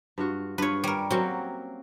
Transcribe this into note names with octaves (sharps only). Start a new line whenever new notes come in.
G2 F4 F#4
G2 F4 B4 C#5
G3 A#4 C#5
F#3 A#3 C4 C#4 F#4